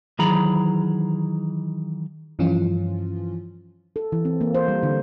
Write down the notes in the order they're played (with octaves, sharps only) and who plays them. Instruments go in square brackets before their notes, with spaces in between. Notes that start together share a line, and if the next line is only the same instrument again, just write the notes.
[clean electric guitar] D#3 E3 F#3 G#4 A#5 B5
[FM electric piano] G2 E3 F3 C#4 F4
[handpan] A4
E3
C4
A#3
C5
G3
D3